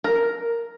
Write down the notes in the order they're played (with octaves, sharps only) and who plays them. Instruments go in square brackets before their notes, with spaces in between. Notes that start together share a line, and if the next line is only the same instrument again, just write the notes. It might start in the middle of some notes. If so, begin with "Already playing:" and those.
[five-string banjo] A#4